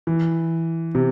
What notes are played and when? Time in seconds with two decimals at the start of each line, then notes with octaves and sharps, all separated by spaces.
0.07 E3
0.95 C3